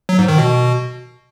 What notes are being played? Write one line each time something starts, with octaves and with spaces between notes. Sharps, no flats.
F#3
G#2
D#3
B2